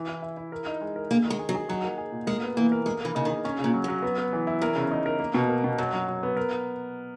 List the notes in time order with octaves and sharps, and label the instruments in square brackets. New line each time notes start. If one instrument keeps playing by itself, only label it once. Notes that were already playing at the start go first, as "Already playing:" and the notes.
Already playing: [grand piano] E3
E4
E4
E4
A#4
D#4
G#3
A#4
[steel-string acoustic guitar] A#3 [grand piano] G#4
[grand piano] D#3
[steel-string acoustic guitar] G#3
[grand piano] G#4
[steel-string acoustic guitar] F#3
[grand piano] G#4
[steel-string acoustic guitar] F#3 [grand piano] D#4
[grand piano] A#3
G#4
A#2
[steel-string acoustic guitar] G#3 [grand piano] A#4
[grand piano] B3
[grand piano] E3 [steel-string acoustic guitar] A#3
[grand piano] A#4
[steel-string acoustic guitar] G#3 [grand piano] A#3
[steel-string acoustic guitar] E3 [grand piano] A#3
[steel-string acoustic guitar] C#3 [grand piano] D#4
[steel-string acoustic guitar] D#3
[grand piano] G#4
[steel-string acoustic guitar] D#3 [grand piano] C#4
[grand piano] C#3
[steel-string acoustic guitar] A#2
[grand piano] F#3
[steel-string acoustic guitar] F#2 [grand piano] F#3
[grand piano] B3
B3
E3
E4
[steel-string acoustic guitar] E2 [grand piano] A#4
[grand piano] C#3
D#4
A#4
A#3
B2
A#3
B2
[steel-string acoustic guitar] F#2 [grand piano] F#3
[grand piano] F#3
F#3
B3
A#4